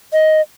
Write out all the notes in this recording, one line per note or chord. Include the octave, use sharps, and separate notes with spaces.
D#5